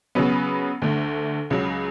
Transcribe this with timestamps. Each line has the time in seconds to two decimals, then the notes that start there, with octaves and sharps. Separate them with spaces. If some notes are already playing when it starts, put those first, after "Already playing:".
0.15 C#3 F#3 B3
0.82 D2 D3 A3
1.50 C#2 C#3 F#3